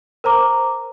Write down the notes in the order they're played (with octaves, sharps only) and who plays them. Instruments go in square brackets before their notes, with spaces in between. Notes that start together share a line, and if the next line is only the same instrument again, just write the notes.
[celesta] A#4 C5 A#5 D6